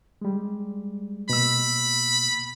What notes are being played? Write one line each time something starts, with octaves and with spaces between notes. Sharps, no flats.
G3 G#3
B2 A#3 B5 E6